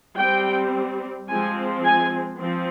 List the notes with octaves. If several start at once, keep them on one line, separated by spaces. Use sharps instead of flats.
G3 C4 G5
F3 G#3 C4 G#5
G#5
F3 C4